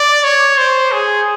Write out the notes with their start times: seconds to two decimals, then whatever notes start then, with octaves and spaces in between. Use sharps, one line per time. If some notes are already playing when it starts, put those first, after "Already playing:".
Already playing: D5
0.24 C#5
0.58 C5
0.92 G#4